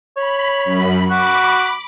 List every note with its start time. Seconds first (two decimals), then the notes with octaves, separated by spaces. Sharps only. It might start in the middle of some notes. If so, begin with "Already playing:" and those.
0.17 C#5 B5
0.65 F#2 B5
1.10 F#4 B5 D6